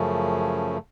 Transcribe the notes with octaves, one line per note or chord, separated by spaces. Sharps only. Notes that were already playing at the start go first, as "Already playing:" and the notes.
Already playing: F#2 C#3 F3 A3 C#4